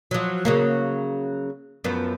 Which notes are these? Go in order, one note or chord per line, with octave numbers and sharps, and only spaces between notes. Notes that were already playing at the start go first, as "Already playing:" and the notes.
F3 F#3
C#3 F#3 A#3
F#2 F3 B3